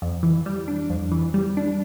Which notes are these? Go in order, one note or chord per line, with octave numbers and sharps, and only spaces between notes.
F2
E3
G3
D4
F2
E3
G3
D4